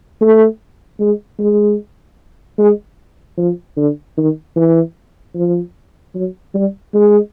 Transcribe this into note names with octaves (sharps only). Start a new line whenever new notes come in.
A3
G#3
G#3
G#3
F3
D3
D#3
E3
F3
F#3
G3
G#3